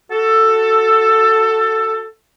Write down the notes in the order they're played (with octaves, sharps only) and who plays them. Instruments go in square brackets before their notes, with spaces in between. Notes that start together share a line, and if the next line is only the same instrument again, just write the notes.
[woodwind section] F#4 A4